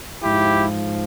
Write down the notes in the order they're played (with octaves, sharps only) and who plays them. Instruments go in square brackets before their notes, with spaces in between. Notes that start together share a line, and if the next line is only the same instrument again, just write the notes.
[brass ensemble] G#2 F3 E4 G4